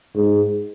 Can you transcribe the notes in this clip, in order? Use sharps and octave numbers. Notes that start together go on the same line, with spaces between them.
G#2